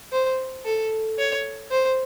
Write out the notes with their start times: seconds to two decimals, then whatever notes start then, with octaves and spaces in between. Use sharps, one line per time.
0.12 C5
0.65 A4
1.18 C#5
1.71 C5